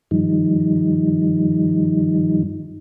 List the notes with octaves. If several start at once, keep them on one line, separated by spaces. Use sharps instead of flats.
G2 D#3 F3 G3 D#4